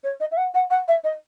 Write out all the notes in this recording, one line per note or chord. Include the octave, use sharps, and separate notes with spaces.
C#5
D#5
E5
F#5
F#5
F#5
E5
D#5